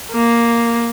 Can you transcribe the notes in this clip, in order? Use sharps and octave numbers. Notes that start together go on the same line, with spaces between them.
A#3